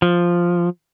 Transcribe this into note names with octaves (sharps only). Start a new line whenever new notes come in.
F3